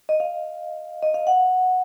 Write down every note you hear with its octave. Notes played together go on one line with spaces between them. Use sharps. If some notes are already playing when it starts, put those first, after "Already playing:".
D#5
F5
D#5
F5
F#5